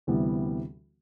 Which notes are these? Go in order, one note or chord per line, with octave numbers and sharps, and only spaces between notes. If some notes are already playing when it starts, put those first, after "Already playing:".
D2 C3 E3 G3 B3